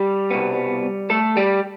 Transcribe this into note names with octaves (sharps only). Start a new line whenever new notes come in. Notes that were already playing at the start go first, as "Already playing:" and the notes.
Already playing: G3 G4
C2 B2 B3
A3 A4
G3 G4